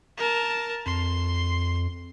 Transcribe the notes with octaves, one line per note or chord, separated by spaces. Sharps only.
A#4 A5
F2 C6